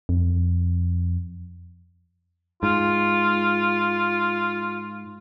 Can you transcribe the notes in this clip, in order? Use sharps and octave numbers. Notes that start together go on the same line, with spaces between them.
F2
G#2 F4